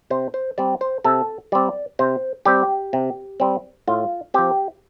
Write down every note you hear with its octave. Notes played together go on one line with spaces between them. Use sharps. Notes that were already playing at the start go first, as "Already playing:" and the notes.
C3 C5
C5
G3 C4 D5
C5
C3 A4
G3 C4 D5
C3 C5
G3 C4 G4
C3
G3 C4
A2 F4
F3 C4 G4